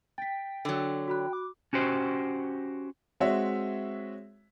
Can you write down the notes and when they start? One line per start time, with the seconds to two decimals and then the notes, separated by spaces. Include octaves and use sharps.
0.18 G5 A6 B6
0.65 D3 F#3
1.08 F#4 B5 F#6
1.33 D6
1.73 C#4 F#4 G4 C5
3.20 G#3 C4 F#4 C#5 E5